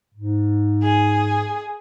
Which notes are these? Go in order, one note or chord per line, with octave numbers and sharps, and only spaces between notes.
G#2
G#4